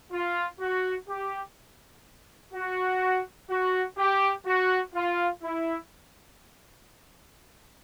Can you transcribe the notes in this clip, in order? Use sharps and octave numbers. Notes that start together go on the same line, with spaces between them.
F4
F#4
G4
F#4
F#4
G4
F#4
F4
E4